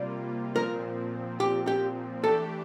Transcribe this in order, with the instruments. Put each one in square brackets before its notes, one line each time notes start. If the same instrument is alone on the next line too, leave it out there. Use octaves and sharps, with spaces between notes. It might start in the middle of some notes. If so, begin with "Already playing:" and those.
Already playing: [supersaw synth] C3 G3 A#3 F4 [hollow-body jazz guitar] D5
[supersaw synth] A#2 F3 C4 [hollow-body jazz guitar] A#4
[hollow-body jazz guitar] G4
G4
[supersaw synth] E3 A3 D4 G4 [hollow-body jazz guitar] A4